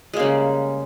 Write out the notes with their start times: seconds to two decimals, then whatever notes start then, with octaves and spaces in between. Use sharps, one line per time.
0.14 G#3
0.17 A#3
0.20 C#3
0.23 G3